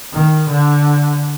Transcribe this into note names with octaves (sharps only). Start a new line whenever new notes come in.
D#3
D3